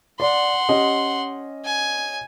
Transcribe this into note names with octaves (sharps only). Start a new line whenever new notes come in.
D5 F#5 C6
C#4 G4 D#5
G#5